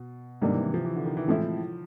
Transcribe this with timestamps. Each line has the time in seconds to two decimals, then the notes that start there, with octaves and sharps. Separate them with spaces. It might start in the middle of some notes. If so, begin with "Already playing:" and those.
Already playing: B2
0.41 G#2 C3 D#3 G3 A#3 D4
0.52 E3
0.63 E3
0.74 F3
0.85 E3
0.96 D3
1.06 D#3
1.17 E3
1.28 A2 E3 F3 G#3 C4 E4